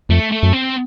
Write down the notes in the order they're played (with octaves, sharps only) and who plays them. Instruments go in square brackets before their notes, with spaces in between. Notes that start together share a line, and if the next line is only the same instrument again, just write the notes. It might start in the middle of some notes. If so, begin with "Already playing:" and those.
[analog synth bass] F2 [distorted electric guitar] A3
[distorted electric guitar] A3
[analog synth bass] F#2
[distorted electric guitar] C4